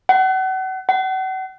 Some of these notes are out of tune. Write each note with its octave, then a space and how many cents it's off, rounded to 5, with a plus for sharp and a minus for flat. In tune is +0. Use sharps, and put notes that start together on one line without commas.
F#5 +35
F#5 +40